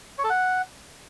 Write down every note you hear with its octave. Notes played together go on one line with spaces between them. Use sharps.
C#5
A4
F#5